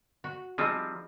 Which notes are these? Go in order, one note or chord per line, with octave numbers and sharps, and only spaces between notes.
F#4
F3 G3 C4 D#4 E4 G#4